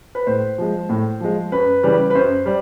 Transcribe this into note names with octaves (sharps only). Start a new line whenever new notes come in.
B4
A2 C5
F3 G#3
A2
F3 G#3
F#2 B4
C#3 E3 G3
B4
F#2 C5
G3